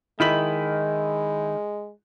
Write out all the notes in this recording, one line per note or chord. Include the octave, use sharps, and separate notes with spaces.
D#3 G#3 E4 B6 F#7